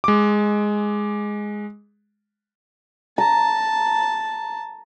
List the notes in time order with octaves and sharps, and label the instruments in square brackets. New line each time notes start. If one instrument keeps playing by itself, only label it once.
[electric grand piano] G#3 D6
[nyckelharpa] A5 [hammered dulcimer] A#5